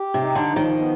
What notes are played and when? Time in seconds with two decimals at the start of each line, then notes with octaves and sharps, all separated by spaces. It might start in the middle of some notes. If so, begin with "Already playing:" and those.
Already playing: G4
0.14 C3
0.21 D#4
0.35 D3
0.50 F3
0.56 D#3
0.78 B3